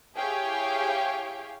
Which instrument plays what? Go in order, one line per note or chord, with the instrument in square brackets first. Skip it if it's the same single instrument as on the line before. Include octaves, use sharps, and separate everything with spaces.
[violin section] E4 G4 G#4 C#5 F5 G5